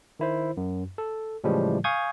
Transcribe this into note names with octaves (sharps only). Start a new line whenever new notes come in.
D#3 E4 C5
F#2
A4
A2 C#3 E3 F3 G3 G#3
F5 G#5 C#6 D#6 G6 G#6